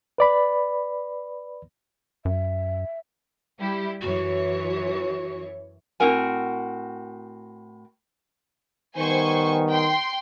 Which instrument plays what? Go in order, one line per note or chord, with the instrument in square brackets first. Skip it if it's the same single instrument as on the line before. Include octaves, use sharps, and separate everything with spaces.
[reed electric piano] B4 D5 B5
[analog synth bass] F#2 [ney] E5
[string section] G3 E4 G4
[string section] F#2 E3 C#5 [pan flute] F#4
[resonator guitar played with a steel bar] A2 C4 F#4 A#4 G#5
[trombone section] D#3 G3 B3 [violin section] C5 G#5 C#6
[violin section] G5 C6